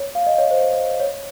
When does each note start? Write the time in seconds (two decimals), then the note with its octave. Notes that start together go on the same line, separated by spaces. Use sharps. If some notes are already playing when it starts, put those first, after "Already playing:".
Already playing: C#5
0.15 F5
0.26 D#5
0.38 C#5
0.51 C5
1.00 C#5